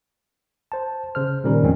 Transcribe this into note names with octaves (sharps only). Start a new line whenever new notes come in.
C5 A5
C#3 C5 F6
A#2 D#3 G3 C#4 A#4
E2 G#2 F3 G#3 C4 C#4